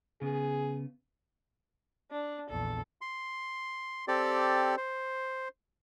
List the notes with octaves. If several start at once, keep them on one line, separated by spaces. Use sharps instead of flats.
C#3 B3 G#4
D4
A#1 E2 A4
C6
C4 G4 A4 D5
C5